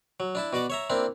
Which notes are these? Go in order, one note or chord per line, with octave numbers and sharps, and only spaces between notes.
F#3
D4 E4 A5
B2 F#4 D5 D6
C#5 E5 A#5
A#3 C4 D4 E4